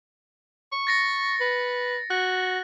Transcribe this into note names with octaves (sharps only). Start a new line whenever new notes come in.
C#6
A6 A#6 C#7
B4
F#4 F#6